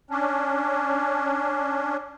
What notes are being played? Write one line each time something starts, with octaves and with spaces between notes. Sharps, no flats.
C#4 D4